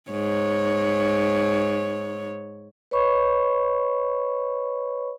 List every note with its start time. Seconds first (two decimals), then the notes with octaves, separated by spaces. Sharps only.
0.10 G#2 C#5
2.91 B4 C#5 D#5 B5 C#6